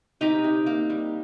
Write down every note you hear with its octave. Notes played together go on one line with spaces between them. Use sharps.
C3 D#4 G4
C3
A#3
G3